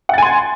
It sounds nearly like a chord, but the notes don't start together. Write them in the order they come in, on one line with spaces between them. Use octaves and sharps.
F#5 A6 G#5 C6